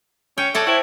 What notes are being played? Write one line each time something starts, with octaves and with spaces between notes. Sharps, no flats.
C#4 G5
A4 C#5 D5 E5 F#5 A5
E4 C5 G5 C#6